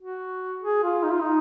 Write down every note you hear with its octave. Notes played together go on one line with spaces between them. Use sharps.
F#4
G#4
F4
D#4
F4
D#4